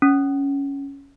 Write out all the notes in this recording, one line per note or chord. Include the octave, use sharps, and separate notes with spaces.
C#4